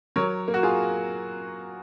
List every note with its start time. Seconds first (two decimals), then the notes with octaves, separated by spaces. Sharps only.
0.16 F#3 A#4 C#5
0.48 A#3
0.54 F#4
0.63 F4 G#4